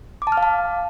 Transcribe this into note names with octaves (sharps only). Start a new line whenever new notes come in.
D6
A5
F6
F5
A5